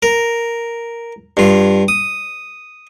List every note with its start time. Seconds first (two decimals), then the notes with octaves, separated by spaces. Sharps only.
0.03 A#4
1.37 G2 F4
1.88 D#6